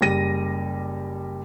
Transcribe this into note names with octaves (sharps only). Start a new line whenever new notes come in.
F#1 G3 A#6 D#7